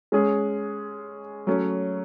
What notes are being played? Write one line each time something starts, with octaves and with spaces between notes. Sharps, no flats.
G#3 C#4 G#4
F#3 A3 C#4